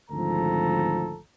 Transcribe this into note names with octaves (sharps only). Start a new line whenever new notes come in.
G#1 D2 F3 A4 A#5